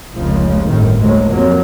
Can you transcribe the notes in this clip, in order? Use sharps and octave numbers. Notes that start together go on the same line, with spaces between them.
F1 C#2 C#3 F3 G#3 A#3
G1 F#2 A2 C3 D#3
D2 F#3 G#3 A#3
F2 C3 F3 F#3 A#3